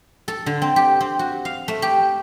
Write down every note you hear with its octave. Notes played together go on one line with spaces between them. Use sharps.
A4
D3
C4
G4
C4
F#4
F5
A3
G4